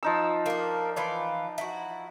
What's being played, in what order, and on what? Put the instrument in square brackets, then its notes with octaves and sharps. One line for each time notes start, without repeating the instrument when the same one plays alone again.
[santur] F3 D#4 E6
[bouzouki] A#3 D4
E3 F4 D5
E4 F#4